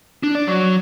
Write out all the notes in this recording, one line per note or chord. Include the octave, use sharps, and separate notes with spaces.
D4
D5
F#3